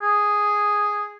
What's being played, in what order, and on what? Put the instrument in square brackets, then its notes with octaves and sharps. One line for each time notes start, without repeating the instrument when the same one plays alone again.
[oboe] G#4